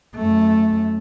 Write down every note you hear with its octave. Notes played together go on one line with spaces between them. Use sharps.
F#2 A3